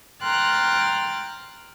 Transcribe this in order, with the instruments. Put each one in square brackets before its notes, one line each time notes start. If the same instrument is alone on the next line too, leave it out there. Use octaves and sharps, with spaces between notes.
[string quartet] G5 A#5 C6 F6 F#6 A6